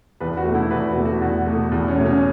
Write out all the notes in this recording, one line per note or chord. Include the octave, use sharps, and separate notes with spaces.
E2 B4
F#4
B2 A3
E4
E2 B4
F#4
B2 A3
F#4
E2 F#4
B2 A3
E2
C#4
B2 A3
C#4